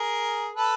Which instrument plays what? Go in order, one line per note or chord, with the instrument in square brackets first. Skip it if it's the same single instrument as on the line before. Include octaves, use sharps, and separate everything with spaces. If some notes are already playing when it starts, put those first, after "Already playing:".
Already playing: [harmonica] G#4 A#4
A4 B4